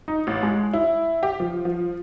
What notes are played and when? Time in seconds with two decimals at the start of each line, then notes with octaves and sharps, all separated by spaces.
0.08 D#4
0.27 A1
0.43 G#3
0.74 E4
1.23 G4
1.40 F3
1.65 F3